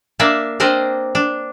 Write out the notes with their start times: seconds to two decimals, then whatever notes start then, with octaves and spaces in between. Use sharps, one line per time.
0.20 A#3 D4 D5 E5
0.60 C4 D4 A#4 C5 D5 D#5
1.15 D4